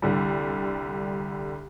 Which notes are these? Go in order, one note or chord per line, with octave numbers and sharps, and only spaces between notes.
C2 D3 G3